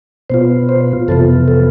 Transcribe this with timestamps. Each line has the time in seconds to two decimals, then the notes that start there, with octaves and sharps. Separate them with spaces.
0.30 B2 B3 F4 C5
0.69 C5
1.08 F2 C3 E3 B3 F4 A4
1.48 A4